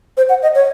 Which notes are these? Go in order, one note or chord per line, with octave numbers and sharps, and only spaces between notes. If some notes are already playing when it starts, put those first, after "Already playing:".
C5
F#5
D#5
C#5